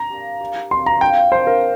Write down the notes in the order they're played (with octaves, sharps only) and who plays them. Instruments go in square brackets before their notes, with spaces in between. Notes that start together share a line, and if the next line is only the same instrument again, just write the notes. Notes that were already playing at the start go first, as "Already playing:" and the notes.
Already playing: [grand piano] A#5
[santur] A#3 D4 G4
A#3 G4 D5 F5
[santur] A#3 G4 D5 F5 [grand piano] C6
[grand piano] A#5
[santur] A#3 D4 F4 [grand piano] G5
[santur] A#3 D4 F4 [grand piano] C5
[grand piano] A#4